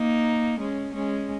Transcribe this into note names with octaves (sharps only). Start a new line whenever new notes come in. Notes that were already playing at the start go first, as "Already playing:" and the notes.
Already playing: A#3 D#4
G#3 C#4
G#3 C#4